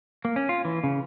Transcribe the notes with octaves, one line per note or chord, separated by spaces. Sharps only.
A#3
C#4
F4
E3
C#3